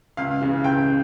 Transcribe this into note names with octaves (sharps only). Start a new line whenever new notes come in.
C#2 F5
C#3 E3
C#2 G5